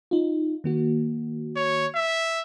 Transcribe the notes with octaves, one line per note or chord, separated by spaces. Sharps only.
D#4 F4
D#3 A#3 F#4
C#5
E5